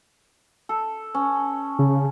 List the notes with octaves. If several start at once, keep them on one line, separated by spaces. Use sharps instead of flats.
A4
C#4
C#3